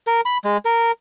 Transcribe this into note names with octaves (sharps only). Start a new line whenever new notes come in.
A#4
B5
G#3
A#4